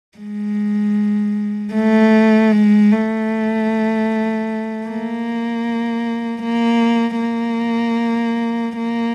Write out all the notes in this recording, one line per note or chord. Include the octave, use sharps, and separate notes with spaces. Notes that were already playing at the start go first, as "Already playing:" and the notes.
G#3
A3
G#3
A3
A#3
A#3
A#3
A#3